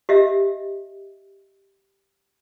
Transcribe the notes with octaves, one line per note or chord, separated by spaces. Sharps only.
G4 D#5 E5